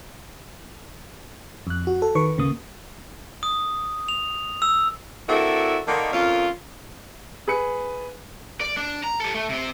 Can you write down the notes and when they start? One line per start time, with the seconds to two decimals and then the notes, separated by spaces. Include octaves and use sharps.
1.67 F2 F#6
1.87 F#4
2.02 A4
2.15 D#3 B4 C#6
2.37 G#1 D2 C#3 A#3 D#6
3.43 D#6
4.08 F7
4.62 E6
5.28 C4 D4 E4 F#4 A4 A#4
5.87 D3 D#3 A#3
6.13 F2 A#3 C#4 F4
7.48 G#4 B4 C#7
8.61 D5
8.77 D4
9.04 A#5
9.20 G4 A4
9.35 A3
9.49 C3 C4